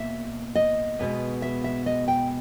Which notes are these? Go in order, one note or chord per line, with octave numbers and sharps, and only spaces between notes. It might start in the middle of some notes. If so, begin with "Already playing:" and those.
Already playing: B2 A#3 E5
D#5
B2 G#3 B3
E5
E5
D#5
G5